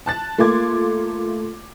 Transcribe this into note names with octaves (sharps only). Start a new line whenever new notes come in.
A5 F#6 A6
A3 A#3 F4 C6 D6 G#6